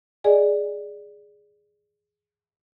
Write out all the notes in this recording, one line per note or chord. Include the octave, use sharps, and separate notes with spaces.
G#4 D5 D#5 G#5